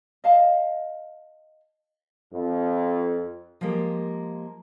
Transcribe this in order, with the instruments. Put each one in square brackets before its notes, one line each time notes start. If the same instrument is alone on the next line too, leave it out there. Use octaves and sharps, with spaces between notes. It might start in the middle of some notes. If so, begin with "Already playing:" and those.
[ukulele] D#5 F5 A5
[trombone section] F2
[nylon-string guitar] F3 G#3 A#3 G4